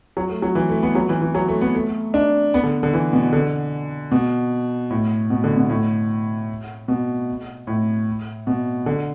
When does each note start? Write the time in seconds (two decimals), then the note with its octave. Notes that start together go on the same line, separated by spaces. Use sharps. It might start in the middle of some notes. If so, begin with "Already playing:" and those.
0.17 F#3
0.30 A3
0.42 F#3
0.55 E3
0.69 A3
0.83 B3
0.95 F#3
1.09 E3
1.21 E3
1.35 F#3
1.48 A3
1.61 B3
1.75 A3
2.14 D4
2.54 B3
2.63 D3
2.83 D3
2.93 E3
3.13 B2
3.33 D3
4.11 B2
4.90 A2
5.30 B2
5.44 D3
5.57 B2
5.70 A2
6.88 B2
7.67 A2
8.47 B2
8.86 D3